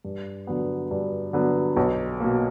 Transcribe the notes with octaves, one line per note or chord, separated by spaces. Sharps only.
G2
D3 F#3 B3
G2
D3 F#3 B3
B1
B2 A#3